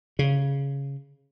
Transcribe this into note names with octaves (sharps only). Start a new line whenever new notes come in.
C#3